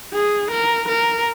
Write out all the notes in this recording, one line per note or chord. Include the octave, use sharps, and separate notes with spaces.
G#4
A#4
A#4